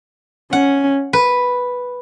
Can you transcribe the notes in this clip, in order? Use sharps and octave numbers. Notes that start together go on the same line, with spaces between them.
C#4 F#5
B4